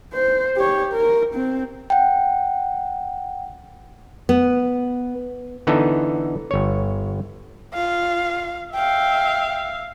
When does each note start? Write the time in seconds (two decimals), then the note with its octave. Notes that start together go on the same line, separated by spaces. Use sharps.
0.13 C5
0.57 G4 C#5
0.93 A#4
1.35 C4
1.90 F#5 G5
4.29 B3
5.67 D3 E3 B3 D#4 A4
6.51 G1 C#5
7.74 F4 F5
8.74 E5 F5 G5